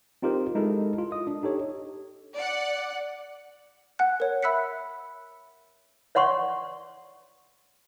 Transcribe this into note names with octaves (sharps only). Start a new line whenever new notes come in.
C4 D#4 F4 G4 A#4 C5
G#3 D#4 E4 A4 A#4
F4
D#5 D#6
D4
D#4 G4 A4 C#5
D5 F#5
F#5 G#5 F#6
A#4 C#5
E5 B5 E6 F#6 B6 C#7
C#5 D5 F#5 C6 C#6